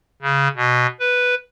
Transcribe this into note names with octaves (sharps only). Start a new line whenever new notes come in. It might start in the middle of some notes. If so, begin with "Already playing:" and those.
C#3
B2
B4